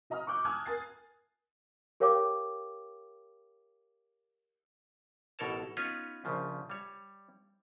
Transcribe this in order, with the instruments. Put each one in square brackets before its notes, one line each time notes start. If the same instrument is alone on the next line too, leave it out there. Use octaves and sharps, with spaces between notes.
[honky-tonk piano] F#4 D#5 A#5 D#6 F6
C#6 D6 F#6 G6
G#5 A5 D#6 F6 F#6 G#6
A#4 G#5 A6 C7
[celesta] G4 A#4 C#5 F5 G5 D6
[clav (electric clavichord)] A1 B2 A4 A#4 C#5 A5
B3 C#4 D#4 F4 B4 C#5
A#1 C#3 F3
G3 C#5